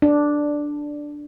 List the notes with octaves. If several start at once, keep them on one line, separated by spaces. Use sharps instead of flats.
D4